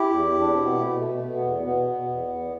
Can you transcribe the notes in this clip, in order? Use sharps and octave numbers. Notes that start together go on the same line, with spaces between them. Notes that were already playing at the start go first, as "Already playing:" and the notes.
Already playing: E4 G4
E2
E2
D4
B2 C4
B3
B2 A3
B2
A3
B2
B3
E2
B2 B3
B2
E2
E2